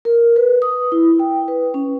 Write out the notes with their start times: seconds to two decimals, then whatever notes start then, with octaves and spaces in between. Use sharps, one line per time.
0.05 A#4
0.36 B4
0.62 D#6
0.92 E4
1.19 G5
1.48 B4
1.74 C#4